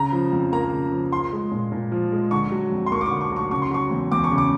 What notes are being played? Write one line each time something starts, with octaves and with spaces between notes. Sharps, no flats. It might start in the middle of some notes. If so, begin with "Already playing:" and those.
Already playing: C#3 A#5
F3
F2
A#3 A#5
C#3
F3
F3 C6
G#3
A#2
A#2
F3
G#3
D3 C#6
F#3
F2
C6
A#3 C#6
D6
C#6
D3
C#6
F#3 C#6
C#3 C#6
C6
F#3 C#6
E2
E2 D6
C#6
C#3
D6